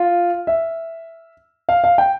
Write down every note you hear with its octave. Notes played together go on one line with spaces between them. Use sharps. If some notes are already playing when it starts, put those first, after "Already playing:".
Already playing: F4
E5
F5
F5
G5